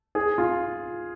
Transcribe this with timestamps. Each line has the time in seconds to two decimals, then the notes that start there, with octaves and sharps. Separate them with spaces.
0.15 G#4
0.38 F4